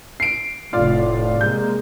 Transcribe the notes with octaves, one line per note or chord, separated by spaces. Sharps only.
C7 D7
F1 A2 F4 D5 F5
C3 G#3 A#3 G6